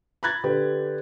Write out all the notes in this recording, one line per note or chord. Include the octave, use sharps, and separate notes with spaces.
A#5 B5 F#6 G#6 A6
D3 G4 B4